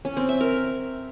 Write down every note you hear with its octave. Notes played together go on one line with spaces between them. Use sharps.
C#4
C4
E5
A#4